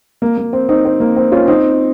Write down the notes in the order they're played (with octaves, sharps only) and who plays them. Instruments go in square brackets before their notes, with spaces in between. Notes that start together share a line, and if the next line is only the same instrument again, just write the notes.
[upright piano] A#3
A#3
C4
C4 D#4
C4
A#3
C4
C#4 F4
C4 D#4